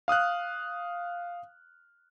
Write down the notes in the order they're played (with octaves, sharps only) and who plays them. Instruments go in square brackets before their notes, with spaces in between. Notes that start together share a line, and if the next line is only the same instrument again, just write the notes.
[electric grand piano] F5 D#6 F6 F#6